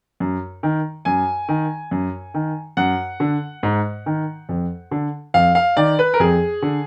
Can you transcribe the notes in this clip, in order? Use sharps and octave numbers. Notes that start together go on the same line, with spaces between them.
F#2
D#3
F#2 G#5
D#3
F#2
D#3
F#2 F#5
D3
G#2
D#3
F2
D3
F2 F5
F5
D#3 D5
B4
A#4
F2 G#4
D3